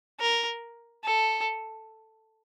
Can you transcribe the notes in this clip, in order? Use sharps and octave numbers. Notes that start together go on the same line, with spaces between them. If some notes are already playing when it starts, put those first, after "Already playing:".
A#4
A4